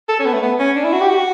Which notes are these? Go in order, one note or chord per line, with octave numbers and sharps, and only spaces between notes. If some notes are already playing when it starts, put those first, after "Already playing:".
A4
C#4
B3
A3
B3
C#4
D4
E4
F#4
G4
F#4